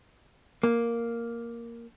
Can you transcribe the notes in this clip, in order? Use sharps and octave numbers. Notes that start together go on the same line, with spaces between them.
A#3